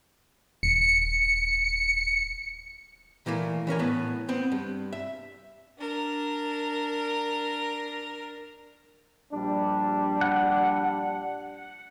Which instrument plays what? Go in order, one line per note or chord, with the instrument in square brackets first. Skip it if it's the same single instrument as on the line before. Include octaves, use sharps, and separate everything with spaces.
[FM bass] D#1 [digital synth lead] C#7
[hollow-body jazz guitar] A#2 E3 A3 A#3
E3 C#4 A#4 G#5
A2 B3
B3 C4
G2
E5
[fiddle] D4 A#4
[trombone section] A#1 G3 D4
[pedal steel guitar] F#5